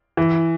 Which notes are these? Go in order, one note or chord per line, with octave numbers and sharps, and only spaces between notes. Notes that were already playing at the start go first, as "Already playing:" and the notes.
E3